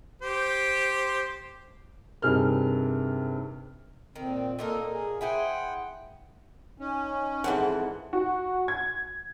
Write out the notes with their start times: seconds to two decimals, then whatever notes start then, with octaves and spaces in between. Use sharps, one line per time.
0.22 G4 C5
2.22 G2 C3 D#4 G#4 A#4 F6
4.16 A#2 D#3 C4
4.59 A#2 A#3 D#4 A4 A#4
4.90 G#4
5.21 E4 G#4 C5 F#5 G5
6.80 C#4 D#4
7.44 F2 G#2 E3 F#5
8.13 F#4
8.68 G#6